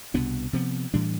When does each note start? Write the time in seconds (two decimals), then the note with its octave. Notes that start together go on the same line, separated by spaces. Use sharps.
0.14 C2 B2 B3 D4
0.53 C3 F3 B3
0.94 A2 E3 G3 D4